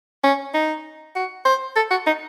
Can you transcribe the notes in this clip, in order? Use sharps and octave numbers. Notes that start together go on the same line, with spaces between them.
C#4
D#4
F#4
C5
A4
F#4
D#4